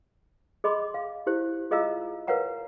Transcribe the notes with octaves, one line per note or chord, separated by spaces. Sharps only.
G#4 D#5 B5 C6 D6
F5
E4 G4 C5
F4 G#4 D#5 F5 A#5 E6
A#4 B4 C#5 F5 F#5 A#5